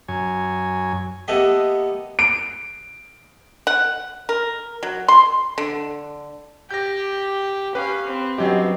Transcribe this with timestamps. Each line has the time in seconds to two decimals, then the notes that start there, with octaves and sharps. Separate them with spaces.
0.08 F#2 C#5 G#5
1.28 A#3 B3 G4 A4 D#5 E5
2.19 D7
3.67 F#5
4.29 A#4
4.83 F#3
5.08 C6
5.58 D3
6.71 G4 G6 A#6
7.75 C#4 G4 B4 F5
8.06 C4
8.38 G2 F#3 C#4 G4 B4 D#5